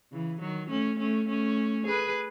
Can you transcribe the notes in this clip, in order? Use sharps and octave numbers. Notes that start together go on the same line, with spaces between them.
C#3 E3
D#3 F#3
A3 C#4
A3 C#4
A3 C#4
G#4 B4